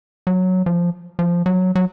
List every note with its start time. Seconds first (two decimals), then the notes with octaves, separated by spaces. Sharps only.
0.27 F#3
0.66 F3
1.19 F3
1.46 F#3
1.75 F#3